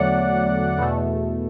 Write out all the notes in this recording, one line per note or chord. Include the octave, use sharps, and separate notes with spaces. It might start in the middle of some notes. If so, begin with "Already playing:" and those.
Already playing: E2 D3 F#3 A3 D5 F#5
E2 B2 A3